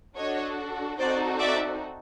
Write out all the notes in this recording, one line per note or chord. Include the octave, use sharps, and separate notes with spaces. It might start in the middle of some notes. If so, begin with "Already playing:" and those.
D4 F#4 A4 C#5 D#5
C4 D#4 F#4 A4 C5 D5
D5 E5